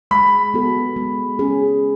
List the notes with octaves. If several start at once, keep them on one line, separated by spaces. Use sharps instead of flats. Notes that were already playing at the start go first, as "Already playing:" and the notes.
G#3 B5
B3 F#4 A4
G#3
C#4 G#4